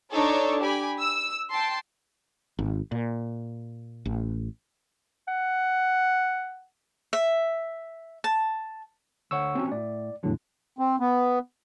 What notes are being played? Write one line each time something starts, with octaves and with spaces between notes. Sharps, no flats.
D4 D#4 A4 C#5
G4 G#5 B5
E6
G5 A5 C6
G#1
A#2
A1
F#5
E5
A5
D2 C#5 F#5 C#6 E6
C4 C#4 F#4
A2 D5
E2 A2 D3 F#3
C4
B3